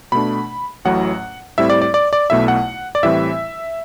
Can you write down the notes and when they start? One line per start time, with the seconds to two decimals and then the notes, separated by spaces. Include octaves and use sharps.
0.12 B2 A3 D4 B5
0.85 A1 A2 F#3 F#5
1.58 A2 G3 C4 E4 E5
1.70 D5
1.82 D5
1.94 D5
2.13 D5
2.30 B1 B2 A3 E4 E5
2.48 F#5
2.95 D5
3.03 A2 E3 G3 C4 E4 E5